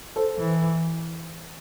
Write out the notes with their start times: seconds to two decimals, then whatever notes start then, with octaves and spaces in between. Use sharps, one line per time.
0.16 A4 C5
0.39 E3